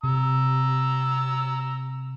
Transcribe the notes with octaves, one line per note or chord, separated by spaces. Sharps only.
C3 A#5 E6